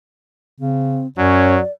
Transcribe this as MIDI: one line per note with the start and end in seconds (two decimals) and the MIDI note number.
0.60 1.07 49
0.60 1.07 60
1.17 1.59 42
1.17 1.61 54
1.17 1.55 61
1.17 1.72 74